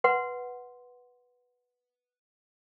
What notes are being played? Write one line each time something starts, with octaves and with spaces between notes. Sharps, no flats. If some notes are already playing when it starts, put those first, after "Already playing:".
B4 F#5 C6